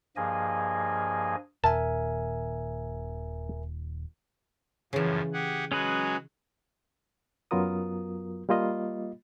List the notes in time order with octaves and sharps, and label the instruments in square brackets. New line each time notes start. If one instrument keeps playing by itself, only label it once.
[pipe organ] G2 F3 A#3 G#4 D#5 G#5
[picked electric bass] D#1 D#2 A#2 [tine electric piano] A#4 E5 G#5 [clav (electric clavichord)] A5
[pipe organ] F#2 A2 F3 [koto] C#3 E3
[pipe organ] G4 G#4 F#5
[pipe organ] F#3 G#3 F#4 [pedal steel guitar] C#4 G#4 B4
[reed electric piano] F#2 F#3 B3 F4 A#4 D#6
G3 A#3 F4 D#5